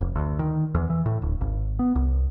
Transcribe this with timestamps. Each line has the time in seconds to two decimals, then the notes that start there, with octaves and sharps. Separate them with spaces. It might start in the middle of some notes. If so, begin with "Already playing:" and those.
0.01 F1
0.16 D2
0.39 D#3
0.75 E2
0.90 E3
1.06 A2
1.22 D1
1.41 G#1
1.79 B3
1.95 C2